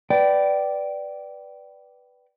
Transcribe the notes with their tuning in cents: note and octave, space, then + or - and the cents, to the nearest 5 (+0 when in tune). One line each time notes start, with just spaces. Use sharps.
B4 +0 D5 +0 G5 -25